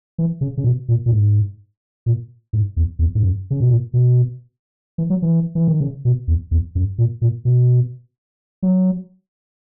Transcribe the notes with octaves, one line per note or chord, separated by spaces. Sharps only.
E3
C#3
C#3
B2
A#2
A#2
G#2
A#2
G#2
E2
E2
G#2
F#2
C#3
B2
A#2
B2
E3
F#3
E3
E3
D#3
C#3
B2
E2
E2
F#2
A#2
A#2
B2
F#3